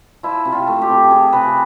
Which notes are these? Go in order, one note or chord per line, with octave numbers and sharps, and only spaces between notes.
F3 E4
C3
F4
A3
G4
C3
F3 G#4
C3 B4